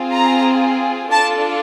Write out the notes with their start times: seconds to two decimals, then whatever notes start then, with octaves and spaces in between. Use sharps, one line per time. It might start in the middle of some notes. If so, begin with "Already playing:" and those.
Already playing: C4 F4 G#4
0.11 A#5
1.11 D4 F4 A4 A5